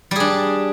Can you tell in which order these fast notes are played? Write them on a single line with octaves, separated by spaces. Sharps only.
G3 G#4 D4